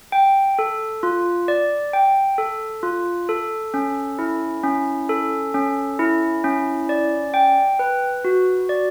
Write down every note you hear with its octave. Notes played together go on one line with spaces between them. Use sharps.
G5
A4
F4
D5
G5
A4
F4
A4
C#4
E4
C#4
A4
C#4
E4
C#4
D5
G5
B4
F#4
D5